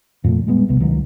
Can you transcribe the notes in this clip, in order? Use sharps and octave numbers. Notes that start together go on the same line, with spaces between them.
F2 A#2 A3
G3 G#3 B3
D#1 A#1 C3 B3
C#2 D#3 F#3